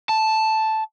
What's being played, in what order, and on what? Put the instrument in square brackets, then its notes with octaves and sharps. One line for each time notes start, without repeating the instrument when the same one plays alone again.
[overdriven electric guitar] A5